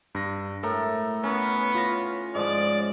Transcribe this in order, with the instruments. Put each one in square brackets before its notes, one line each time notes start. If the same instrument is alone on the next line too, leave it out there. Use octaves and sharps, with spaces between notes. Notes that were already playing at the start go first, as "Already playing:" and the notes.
[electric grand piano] G2 A#6
[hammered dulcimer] A2 [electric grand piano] A4 A#4 A#5
[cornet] B3 [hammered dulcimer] C#4
[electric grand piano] F4 A#6
[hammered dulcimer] G#2 F3 [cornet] D5